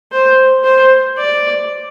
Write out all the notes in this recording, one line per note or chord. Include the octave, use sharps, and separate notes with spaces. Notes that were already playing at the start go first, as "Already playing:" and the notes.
C5
C5
D5